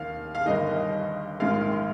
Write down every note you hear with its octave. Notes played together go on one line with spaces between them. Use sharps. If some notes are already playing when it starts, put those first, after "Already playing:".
Already playing: D#2 D#3 F5
F5
G1 G2 D#3 D#5
A#1 G#2 D#3 F5